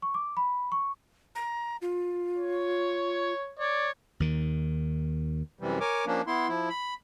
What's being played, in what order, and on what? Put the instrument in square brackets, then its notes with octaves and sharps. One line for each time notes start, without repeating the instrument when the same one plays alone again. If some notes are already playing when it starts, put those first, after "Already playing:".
[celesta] C#6
D6
B5
C#6
[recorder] A#5
F4
[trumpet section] C#5
C#5 D5
[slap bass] D#2 D#3
[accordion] F#2 C3 E3 G3
A#4 C#5 G#5 D6
F3 A#3 C#4 D4
B3 E4 C6
F3 E4
B5